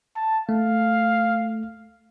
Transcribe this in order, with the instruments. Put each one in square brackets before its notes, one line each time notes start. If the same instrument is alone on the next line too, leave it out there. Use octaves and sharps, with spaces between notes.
[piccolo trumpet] A5
[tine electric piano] A3 [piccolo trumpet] F5